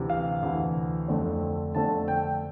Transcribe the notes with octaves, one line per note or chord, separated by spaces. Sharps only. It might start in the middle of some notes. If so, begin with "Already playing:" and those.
Already playing: D2 C3 E3
F5
D2 C3 E3
F2 D3 A3 C4
F2 D3 A3 C4 A5
G5